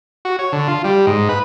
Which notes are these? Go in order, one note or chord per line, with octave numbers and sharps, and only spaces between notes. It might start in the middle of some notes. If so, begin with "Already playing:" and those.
F#4
C#5
D3
F4
G3
G#2
B4